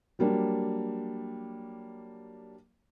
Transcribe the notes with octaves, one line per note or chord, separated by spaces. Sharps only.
F#3 G3 A#3 D4